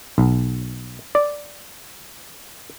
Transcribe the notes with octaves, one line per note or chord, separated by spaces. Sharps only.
B1
D5